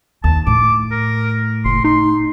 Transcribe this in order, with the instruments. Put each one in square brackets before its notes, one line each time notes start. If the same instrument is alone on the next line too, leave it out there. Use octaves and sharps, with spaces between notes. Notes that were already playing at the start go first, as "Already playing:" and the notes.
[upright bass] D#2 [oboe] A5
[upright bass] A2 [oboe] D6
[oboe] A#4
[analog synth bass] F#1 [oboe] C6
[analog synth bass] D#4 [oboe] C6